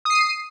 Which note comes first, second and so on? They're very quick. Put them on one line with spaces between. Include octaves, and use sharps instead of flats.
D#6 C7 D#7